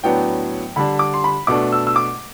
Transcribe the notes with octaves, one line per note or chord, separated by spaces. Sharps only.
A2 F#3 B3 D4 G5
D3 G3 D4 B5
D6
C6
B5
B2 A3 D4 D6
E6
E6
D6